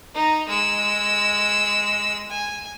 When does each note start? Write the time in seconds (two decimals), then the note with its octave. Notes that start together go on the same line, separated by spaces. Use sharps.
0.15 D#4 A#5
0.49 G#3 E6
2.30 G#5